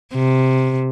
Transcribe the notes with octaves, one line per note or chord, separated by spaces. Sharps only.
C3